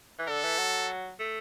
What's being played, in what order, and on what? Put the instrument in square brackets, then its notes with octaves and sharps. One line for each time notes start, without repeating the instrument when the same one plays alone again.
[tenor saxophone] E3
[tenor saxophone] D3 [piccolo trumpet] A4
[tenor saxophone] E3
F#3
A3